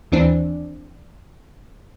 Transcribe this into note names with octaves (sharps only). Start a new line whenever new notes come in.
D#2 E3 C4 D4